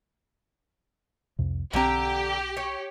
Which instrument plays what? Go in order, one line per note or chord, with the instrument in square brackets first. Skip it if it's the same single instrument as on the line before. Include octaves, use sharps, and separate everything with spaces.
[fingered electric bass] C2 F2 C3
[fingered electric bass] B1 E3 C4 [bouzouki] D3 A#5 [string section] G4
[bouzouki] C#5